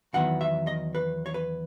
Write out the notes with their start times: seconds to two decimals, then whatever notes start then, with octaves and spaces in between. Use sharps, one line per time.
0.13 E2 D#3 F#3 B3 E4 F#5
0.41 E5
0.67 D#5
0.95 B4
1.26 C#5
1.34 B4